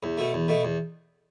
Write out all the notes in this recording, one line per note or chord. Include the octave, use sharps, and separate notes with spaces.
E2
B2 A3
E2
B2 A3
E2